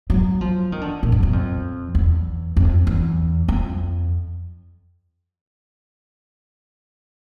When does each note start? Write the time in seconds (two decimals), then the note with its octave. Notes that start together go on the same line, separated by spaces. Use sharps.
0.10 F#3
0.41 F3
0.72 D#3
0.81 D3
1.03 A#2
1.12 F#2
1.23 F#2
1.33 F2
1.95 E2
2.57 F2
2.87 E2
3.48 F2